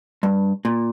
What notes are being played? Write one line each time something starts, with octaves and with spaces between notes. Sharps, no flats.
G2
A#2